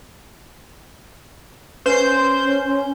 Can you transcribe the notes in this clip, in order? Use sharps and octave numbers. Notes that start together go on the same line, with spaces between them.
C#4 B4 C5 G6